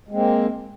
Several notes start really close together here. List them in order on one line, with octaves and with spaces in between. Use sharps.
G#3 C4 A#3